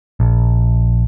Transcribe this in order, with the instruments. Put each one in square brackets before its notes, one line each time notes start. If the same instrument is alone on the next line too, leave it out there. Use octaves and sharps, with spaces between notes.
[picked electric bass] A#1